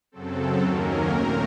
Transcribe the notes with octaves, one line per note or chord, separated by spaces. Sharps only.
F#2 C#3 F#3 C4 A4
D#2 D#3 F#3 A#3 C#4 A#4
A#2 A3 C4